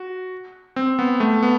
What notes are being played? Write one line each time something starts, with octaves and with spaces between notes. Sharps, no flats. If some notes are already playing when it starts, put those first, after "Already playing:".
Already playing: F#4
C4
B3
A3
B3